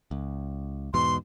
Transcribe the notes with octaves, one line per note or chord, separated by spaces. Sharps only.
C#2
E2 G#2 B2 C6